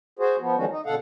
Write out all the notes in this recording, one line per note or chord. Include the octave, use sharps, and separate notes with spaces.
F#4 G#4 C5
F3 B3
D#3 F3 G3 G#3 C#4 F#4
D#4
B2 D3 A4 F5 F#5